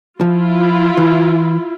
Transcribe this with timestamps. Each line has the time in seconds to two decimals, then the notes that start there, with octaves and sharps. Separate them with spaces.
0.21 F3 E4 F4
0.97 E3